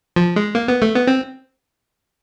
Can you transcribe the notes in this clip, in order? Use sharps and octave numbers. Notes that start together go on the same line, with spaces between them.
F3
G#3
A#3
B3
A3
B3
C4